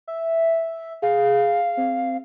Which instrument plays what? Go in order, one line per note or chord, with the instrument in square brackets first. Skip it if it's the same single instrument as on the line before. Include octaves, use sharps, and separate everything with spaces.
[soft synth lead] E5
[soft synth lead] G#4 [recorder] F5
[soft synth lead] C4